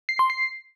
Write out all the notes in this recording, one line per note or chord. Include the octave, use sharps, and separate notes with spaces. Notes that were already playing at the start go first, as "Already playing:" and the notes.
C7
C6
C7